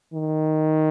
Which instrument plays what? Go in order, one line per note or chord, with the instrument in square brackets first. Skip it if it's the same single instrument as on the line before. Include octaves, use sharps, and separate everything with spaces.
[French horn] D#3